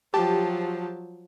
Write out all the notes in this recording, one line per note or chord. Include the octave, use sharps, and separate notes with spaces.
F3 F#3 G4 A5